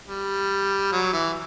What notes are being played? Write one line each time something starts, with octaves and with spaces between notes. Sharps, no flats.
G3
F#3
E3